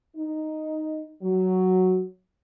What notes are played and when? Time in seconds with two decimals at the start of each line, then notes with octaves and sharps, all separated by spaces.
0.16 D#4
1.23 F#3